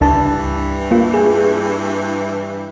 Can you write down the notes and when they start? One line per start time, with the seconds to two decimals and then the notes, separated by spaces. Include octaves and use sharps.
0.01 C#2 G2 E3 D4 A5
0.91 A#3 F4
1.14 G#4